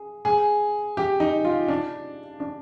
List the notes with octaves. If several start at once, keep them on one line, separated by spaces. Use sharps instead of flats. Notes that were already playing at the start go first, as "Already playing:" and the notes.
Already playing: G#4
G#4
G4
D#4
F4
D4
D4